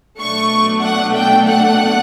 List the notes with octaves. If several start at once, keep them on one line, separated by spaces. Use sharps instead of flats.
B2 F#3 A3 D4 C#6
F#5
G5
F#5